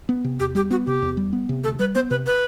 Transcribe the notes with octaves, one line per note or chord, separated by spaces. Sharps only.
B3
C3
E2 G4
G3 G4
B3 F#4
C3 G4
E2
G3
B3
C3
D2 A4
G3 B4
B3 C5
C3 B4
B4